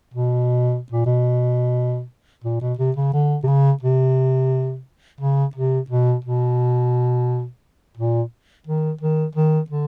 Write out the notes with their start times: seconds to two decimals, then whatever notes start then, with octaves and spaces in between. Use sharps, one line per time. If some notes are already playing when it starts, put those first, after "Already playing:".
0.14 B2
0.92 A#2
1.06 B2
2.44 A#2
2.61 B2
2.79 C3
2.97 C#3
3.13 D3
3.44 C3
3.48 C#3
3.83 C3
5.20 C#3
5.56 C3
5.90 B2
6.25 B2
7.97 A#2
8.67 D#3
9.01 D#3
9.36 D#3
9.70 D3